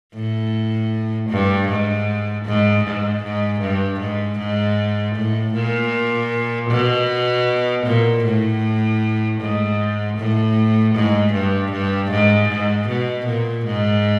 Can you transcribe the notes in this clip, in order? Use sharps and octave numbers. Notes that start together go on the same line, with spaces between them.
A2
G2
G#2
G#2
G#2
G#2
G2
G#2
G#2
A2
A#2
B2
A#2
A2
G#2
A2
G#2
G2
G2
G#2
G#2
B2
A#2
G#2